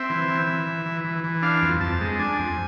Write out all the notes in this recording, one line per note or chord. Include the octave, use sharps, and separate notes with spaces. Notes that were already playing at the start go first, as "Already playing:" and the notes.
Already playing: C4 E5
E3
E3
E3
E3
E3
E3
E3
D4 F5
F2
F2 A5
G#3
D4 G#5
F2